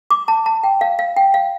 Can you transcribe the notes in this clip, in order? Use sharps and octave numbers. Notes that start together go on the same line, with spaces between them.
D6
A5
A5
G5
F5
F5
G5
F5